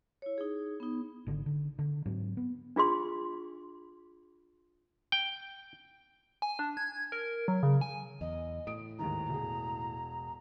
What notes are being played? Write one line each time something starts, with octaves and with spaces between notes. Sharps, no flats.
E4 C#5
D#4 G#4
B3 D#4
G#1 D3
D3
D3
G#2 F#3 C4 D4
B3
D4 F4 G#4 C6
G5
G#5
D4
G#6
A#4
F#3
C#3
G#5
E2 D#5
A2 D#6 D7
D#2 G#2 D#3 A#5
E1 G#4